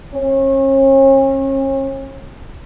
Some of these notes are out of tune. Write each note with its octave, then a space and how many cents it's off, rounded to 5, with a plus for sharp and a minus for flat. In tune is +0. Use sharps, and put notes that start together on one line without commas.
C#4 -40